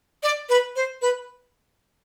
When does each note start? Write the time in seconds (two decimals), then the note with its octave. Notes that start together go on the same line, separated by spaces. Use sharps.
0.23 D5
0.49 B4
0.76 C5
1.02 B4